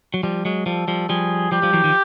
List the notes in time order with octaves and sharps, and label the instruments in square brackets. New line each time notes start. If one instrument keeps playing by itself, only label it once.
[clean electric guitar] F#3
F3 G3
F#3 G#3
[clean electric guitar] F3 G3 [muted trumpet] A4
[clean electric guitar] F3 G3
[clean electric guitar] F3 G3 [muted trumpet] G#4
[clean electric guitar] F3 G3 [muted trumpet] G4
[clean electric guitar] F3 G3
E3 F#3
D#3 F3